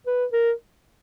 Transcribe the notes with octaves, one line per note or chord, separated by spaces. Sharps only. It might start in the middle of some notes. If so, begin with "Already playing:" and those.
B4
A#4